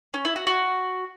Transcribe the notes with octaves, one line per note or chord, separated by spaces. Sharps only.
C#4
E4
F#4
F#4